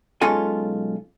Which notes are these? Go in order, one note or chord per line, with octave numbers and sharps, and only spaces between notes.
B1 G#3 C#4 F4 A4 G#5